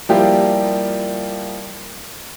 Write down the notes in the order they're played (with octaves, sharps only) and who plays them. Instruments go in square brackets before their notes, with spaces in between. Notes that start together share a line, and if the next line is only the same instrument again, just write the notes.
[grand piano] F3 G3 A#3 E4 F4 G4